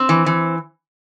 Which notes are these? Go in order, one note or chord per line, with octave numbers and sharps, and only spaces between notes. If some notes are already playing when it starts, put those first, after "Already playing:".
Already playing: C4
E3
E3